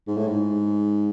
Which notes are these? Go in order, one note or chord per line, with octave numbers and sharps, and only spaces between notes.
G#2
A2
G#2